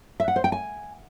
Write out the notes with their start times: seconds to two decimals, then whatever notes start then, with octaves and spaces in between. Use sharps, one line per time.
0.20 E5
0.28 F#5
0.36 C5
0.44 G5
0.52 G#5